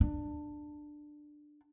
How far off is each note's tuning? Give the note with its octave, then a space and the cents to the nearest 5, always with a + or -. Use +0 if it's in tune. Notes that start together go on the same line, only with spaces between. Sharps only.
D4 +15